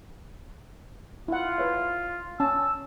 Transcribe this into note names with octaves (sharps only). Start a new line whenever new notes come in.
E4 F4 F#5
B4 C#5 E5
C#4 A5 E6